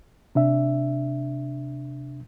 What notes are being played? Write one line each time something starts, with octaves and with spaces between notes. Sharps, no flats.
C3 D4 E5